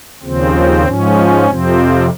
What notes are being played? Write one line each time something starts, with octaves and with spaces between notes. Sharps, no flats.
D#2 C#3 F3 C4
G#2 F3 C#4
F2 C3 F3 C4